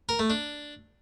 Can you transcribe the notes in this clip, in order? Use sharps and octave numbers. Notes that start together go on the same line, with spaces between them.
A#4
A3
D4